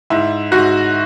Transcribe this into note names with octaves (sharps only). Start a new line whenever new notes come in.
G#2 E4
G#2 F#4